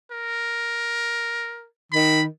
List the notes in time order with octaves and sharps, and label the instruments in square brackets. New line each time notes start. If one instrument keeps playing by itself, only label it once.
[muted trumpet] A#4
[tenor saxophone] D#3 [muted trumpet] B5